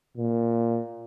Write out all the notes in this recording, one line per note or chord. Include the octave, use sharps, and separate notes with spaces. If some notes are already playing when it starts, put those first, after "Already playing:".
A#2